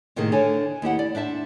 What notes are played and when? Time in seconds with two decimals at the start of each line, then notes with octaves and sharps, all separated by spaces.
0.16 A2 C3 D#3 A#3 D#4 G#4
0.32 D3 D4 C#5 G#5
0.82 D#2 E4 G4 F#5
0.99 D5
1.15 D4 C5 E5 A5